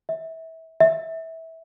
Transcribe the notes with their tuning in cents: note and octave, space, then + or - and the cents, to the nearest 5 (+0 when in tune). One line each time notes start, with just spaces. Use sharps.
E5 -25
E5 -20